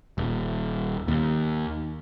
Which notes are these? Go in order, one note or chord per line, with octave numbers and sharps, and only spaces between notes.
D#1
D#2